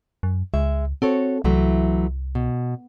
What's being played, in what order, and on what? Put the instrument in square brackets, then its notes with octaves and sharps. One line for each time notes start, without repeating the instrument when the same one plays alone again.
[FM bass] F#2
[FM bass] C#2 [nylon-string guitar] G#3 E5
[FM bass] C4 [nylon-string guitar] F#4 A4 C#5
[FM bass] C2 [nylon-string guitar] E3 F#3 A3
[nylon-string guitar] B2